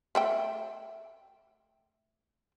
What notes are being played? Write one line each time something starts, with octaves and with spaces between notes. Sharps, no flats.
A3 E5 G5